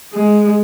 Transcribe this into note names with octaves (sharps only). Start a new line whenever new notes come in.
G#3